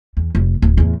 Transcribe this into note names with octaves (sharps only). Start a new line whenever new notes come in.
E2
F1
D1
E2 A2